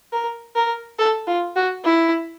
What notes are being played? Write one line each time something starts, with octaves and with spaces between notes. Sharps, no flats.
A#4
A#4
A4
F4
F#4
E4